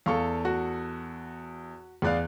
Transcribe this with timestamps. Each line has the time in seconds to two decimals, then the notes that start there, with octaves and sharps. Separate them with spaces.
0.06 E2 A4 F5 C#6
0.45 F#4
2.02 E2 G#4 D5 F5 F#6